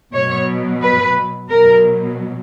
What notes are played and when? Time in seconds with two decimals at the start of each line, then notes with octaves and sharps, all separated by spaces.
0.13 B2 F#3 C#5
0.81 B4
1.49 B2 F#3 A#4